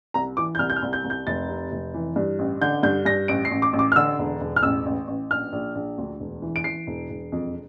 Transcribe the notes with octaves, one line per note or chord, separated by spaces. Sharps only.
C2 A#5
E3 D6
G6
C2 F6
G6
F6
C2
G6
C2
G6
F1 A6
C3
F1
E3
G2
A1
D3 G6
G2 G6
G2 A#6
A1 D7
C7
A1
D6
A1
D6
F6
D3 E6
E1
E1
F6
A1 E6
A1
A1
A#1 F6
A#1
A#1
D2
E1
E3
D7
E3 C7
E1
E1
F2